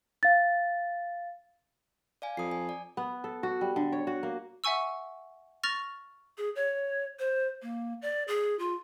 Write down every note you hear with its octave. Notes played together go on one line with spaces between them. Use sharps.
F5 A6
D5 F5 G#5
F2 D#6 C7
G#5
D5
B3
A4
F#4
G3
D3
C#5
F#4
A#3
E5 F#5 G#5 C#6 E6
C#6 F6 A6 A#6 F7
G#4
C#5
C5
A#3
D5
G#4
F4